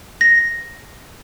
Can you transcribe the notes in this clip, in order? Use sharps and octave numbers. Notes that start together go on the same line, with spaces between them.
A#6